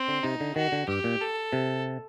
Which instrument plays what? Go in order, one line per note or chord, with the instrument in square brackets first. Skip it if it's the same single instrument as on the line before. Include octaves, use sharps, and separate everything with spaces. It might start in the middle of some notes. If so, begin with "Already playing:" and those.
Already playing: [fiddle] C4
[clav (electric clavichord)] D3
[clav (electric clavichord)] C3 [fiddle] D#4
[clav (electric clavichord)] D3
[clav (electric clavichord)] D#3 [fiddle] F#4
[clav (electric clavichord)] D3
[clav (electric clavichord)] G2 [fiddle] G4
[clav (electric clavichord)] A#2
[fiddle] A4
[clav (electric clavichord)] C3